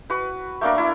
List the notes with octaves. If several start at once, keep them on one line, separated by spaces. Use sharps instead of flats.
F#4 B4
A3 A#3 D4 A#4
E4